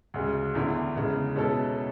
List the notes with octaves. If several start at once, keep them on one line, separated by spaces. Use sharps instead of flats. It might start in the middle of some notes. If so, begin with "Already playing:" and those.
D2 C#3 G#3
E2 D3 A3 E4
E2 C#3 G#3
B2 G#3 C#4 E4 A4